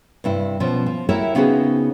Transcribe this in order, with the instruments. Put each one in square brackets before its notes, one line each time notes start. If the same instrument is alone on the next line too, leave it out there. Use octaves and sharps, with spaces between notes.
[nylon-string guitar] G2 C3 E4
B2 F3 C#4
F3
E4 F#4 G4 A#4 C#5 E5
C#3 B3 C4 D#4 F#4 G#4